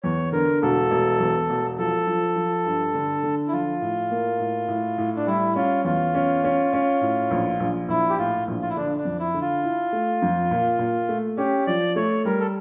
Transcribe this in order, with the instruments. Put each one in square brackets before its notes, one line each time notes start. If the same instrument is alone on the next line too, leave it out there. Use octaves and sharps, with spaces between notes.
[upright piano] E2 [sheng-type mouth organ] C#5
[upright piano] D3 [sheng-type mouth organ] A#4
[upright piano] E1 [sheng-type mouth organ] A4
[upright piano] E1
E2
E1
[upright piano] F3 [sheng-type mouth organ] A4
[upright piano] F3
F3
G2
D3
D3
[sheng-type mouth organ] E4
[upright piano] F3 [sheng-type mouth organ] F4
[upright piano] A2
A#3
A2
A2
A2
[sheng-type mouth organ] D4
[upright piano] G3 [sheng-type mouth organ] E4
[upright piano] C#4 [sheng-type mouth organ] F4
[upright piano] E2 [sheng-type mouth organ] F4
[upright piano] C#4
C#4
C#4
A2
A#1
A#1
[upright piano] A#1 [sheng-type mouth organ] E4
[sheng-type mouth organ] G4
[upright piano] A2 [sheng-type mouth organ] F4
[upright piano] A#1
[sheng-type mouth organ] F4
E4
[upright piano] D3 [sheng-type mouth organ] D4
[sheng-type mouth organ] D4
[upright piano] F2
[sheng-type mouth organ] E4
[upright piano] D3
[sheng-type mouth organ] F4
[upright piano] E4
A3
F2
A#2
A#2
A3
[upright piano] C#4 [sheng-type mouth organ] G4
[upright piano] F3 [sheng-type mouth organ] D5
[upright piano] A3 [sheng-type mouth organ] C#5
[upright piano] G3 [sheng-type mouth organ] A#4
[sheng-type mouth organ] A4